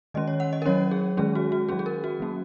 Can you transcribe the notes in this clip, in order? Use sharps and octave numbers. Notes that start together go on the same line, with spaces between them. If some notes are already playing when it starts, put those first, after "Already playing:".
D#3 G#3 C#4 D#5
C#5
F#5
D#5
A#4
F#3 C#4 C#5
G#4
D#3 G#3 C#4 G#4
F#4
F#4
F#3 C#4 G#4
G#4
A#4
F#4
F#3 A#3 C#4